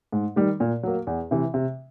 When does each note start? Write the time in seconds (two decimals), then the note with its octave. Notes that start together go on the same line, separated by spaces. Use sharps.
0.12 G#2
0.36 D#3 G3
0.60 A#2
0.83 F#3 A#3
1.07 E2
1.31 C3 E3
1.54 C3